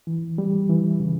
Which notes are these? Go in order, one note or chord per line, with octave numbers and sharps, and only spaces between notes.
E3
G3
E3
C#3